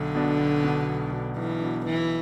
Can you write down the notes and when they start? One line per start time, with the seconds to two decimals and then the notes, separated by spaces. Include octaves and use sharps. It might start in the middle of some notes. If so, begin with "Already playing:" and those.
Already playing: B1 D3
0.15 B2 B3 D4
0.39 B1
0.64 B2 B3 D4
0.88 B1
1.13 B2 B3 D4
1.36 B1 E3
1.62 B2 B3 D4
1.86 B1 E3